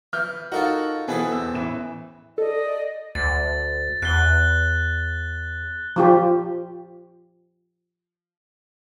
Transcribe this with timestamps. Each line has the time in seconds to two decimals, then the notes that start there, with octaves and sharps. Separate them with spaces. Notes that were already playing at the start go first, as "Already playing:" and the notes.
0.13 E3 F6 G6
0.52 D#4 F4 F#4 A4 A#4 F#5
1.08 B2 E3 B3 C4 G#4 A4
1.32 E2 E6
1.54 A1 E3 E7
2.38 A4 D5 D#5
3.15 D2 A6
4.02 E2 F#6 G7
5.96 F3 F4 G4